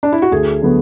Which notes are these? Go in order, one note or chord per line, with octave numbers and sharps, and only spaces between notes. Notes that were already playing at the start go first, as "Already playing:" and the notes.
D4
E4
F#4
D2 G#4
D3 F#3 B3 F#4